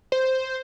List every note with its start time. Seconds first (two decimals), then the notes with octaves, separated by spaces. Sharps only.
0.12 C5